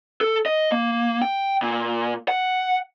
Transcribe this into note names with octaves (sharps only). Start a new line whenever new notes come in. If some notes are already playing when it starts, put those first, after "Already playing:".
A4
D#5
A#3
G5
A#2
F#5